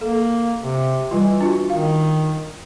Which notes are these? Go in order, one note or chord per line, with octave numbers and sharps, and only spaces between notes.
A#3 A4
C3
E3 G3 F4
D4 F4 F#4
D#3 F5